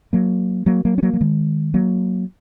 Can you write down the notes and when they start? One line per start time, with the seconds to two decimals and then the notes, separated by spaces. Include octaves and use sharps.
0.13 F#3 A#3
0.66 F#3 A#3
0.85 F#3 A#3
0.98 C#4
1.03 F#3 A#3
1.14 F#3
1.21 D#3 G#3
1.74 F#3 A#3